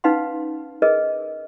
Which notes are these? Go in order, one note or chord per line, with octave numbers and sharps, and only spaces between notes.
C#4 D#4 B4 F5 F#5 C6
G#4 A#4 B4 D#5